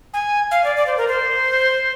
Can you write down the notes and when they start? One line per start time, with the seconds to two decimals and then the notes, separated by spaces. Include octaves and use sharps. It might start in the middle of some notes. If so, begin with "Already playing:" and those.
0.13 G#5
0.51 F5
0.64 D5
0.76 D5
0.86 C5
0.97 A#4
1.08 C5